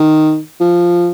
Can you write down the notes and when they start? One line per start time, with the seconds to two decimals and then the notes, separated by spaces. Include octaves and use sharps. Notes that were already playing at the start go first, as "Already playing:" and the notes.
Already playing: D#3
0.60 F3